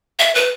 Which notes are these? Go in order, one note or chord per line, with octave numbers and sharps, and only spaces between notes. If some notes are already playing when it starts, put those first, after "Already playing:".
E5
B4